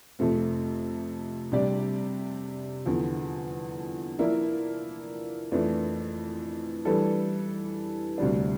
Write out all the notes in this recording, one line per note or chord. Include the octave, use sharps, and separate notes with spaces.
F2 C3 F3 A3 C4
C3 G3 D4 G4 D5
E2 D3 F3
F3 A#3 E4 A#4 D5
F2 E3 A3 D4
E3 G3 D4 A4
D2 C3 G3 D4